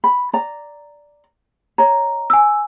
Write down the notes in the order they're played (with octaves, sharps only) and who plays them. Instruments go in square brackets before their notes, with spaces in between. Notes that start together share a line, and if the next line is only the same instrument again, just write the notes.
[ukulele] B5
D5 A#5
[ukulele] C#5 D#5 [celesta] A#5
[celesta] G#5 E6